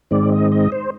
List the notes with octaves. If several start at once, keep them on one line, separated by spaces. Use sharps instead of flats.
G#2 D#3 G#3 C4 D5
D#5
D#5
C5